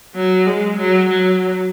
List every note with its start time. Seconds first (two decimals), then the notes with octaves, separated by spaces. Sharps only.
0.15 F#3
0.47 G#3
0.78 F#3
1.09 F#3